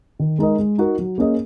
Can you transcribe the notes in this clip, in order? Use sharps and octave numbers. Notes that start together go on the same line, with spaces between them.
D#3
G#3 D#4 A#4 D#5
G#3
D#4 F#4 A#4
F#3
A#3 C#4 G#4 D#5